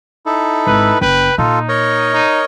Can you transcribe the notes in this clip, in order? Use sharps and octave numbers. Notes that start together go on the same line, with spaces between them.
D#4 E4 A4
G#1 B4
F#1 B4 G5
A#2 D#4 F4 A4
A#4 C#5 D#5
D#4